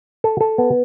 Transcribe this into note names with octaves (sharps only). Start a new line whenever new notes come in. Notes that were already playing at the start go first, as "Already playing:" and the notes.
A4
A4
B3